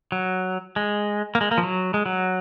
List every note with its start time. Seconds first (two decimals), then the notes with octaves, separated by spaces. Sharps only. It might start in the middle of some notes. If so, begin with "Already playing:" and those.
0.12 F#3
0.76 G#3
1.35 A#3
1.41 G#3
1.51 A#3
1.58 F3
1.63 F#3
1.94 G#3
2.06 F#3